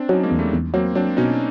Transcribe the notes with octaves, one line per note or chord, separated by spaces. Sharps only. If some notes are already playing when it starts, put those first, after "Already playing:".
Already playing: C4 D4
F#3 C#4 D#4
G#3 A#3
E2
G3 A3
E2
F#3 A#3 C4
F#3 C4 D4
B2 C#4 D#4